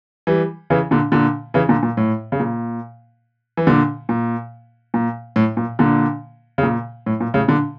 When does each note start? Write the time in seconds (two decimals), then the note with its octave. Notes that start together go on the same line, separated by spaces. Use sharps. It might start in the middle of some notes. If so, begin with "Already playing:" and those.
0.27 E3 G3
0.70 C#3 E3
0.91 A#2 D3
1.12 A#2 D3
1.54 C#3 E3
1.69 A#2 D3
1.83 A#2
1.97 A2
2.32 C#3
2.40 A#2
3.57 E3
3.67 A#2 D3
4.09 A#2
4.94 A#2
5.36 A2
5.57 A#2
5.79 A#2 D3
6.58 C#3
6.63 A#2
7.06 A2
7.20 A#2
7.34 A2 C#3
7.48 A#2 D3